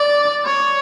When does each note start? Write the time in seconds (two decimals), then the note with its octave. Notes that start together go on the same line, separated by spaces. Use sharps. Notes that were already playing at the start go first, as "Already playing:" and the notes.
Already playing: D5
0.45 C#5